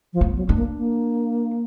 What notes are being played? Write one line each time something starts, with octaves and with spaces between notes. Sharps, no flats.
F3
B3
F#3
D4
A#3
A#3